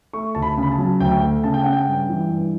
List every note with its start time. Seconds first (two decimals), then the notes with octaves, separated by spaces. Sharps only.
0.13 A3 C#6
0.35 D2 A5
0.42 B5
0.57 C#3
0.63 B5
0.71 A5
0.78 F#3
1.00 D2 G5
1.22 A3
1.44 C#3 A5
1.54 G5
1.63 C#3 F#5
1.73 G5
1.87 G2
2.09 E3
2.31 G2